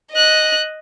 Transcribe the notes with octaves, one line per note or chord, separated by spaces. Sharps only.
D#5 F#6